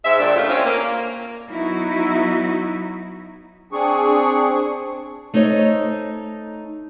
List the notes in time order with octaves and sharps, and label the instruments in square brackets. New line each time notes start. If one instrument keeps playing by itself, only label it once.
[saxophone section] G#2 E5
G2 A#2 D#3 D4
G3 A3 A#3 C#4 F4
C4 C#4
A#3
[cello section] F#3 B3 D#4 E4 F#4
[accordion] C4 D4 G#4 C#6
[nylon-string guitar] A3 D#4 C5 C#5 D#5